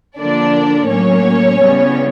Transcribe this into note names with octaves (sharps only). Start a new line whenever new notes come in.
D3 F3 A#3 D4 D5
A2 F#3 A#3 C#4 C#5
C#3 E3 G3 B3